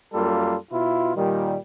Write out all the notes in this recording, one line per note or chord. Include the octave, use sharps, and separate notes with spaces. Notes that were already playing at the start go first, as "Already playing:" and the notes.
F#2 G3 A#3 F4 A4
B2 E4 F4
A#2 D#3 G3